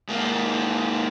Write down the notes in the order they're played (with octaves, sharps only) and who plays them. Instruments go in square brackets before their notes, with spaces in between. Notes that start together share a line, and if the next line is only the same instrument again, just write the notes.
[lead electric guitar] G#2 A#3